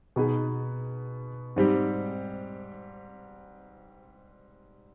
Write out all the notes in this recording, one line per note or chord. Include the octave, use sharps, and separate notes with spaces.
B2 B3 D#4 G#4
G#2 G3 C4 G4